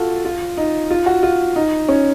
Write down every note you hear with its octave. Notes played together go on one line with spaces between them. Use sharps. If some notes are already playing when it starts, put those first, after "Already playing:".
Already playing: F4 F#4 A4
F4
D#4
F4
F#4
F4
D#4
C#4